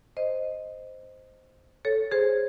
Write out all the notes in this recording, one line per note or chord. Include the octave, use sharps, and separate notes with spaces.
C5 D#5
A4 C#5
G#4 C5